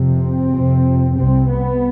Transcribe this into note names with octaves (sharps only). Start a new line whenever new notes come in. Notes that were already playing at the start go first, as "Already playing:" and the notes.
Already playing: F2 C3
C4
F2 C3
C2 C3 C4
B3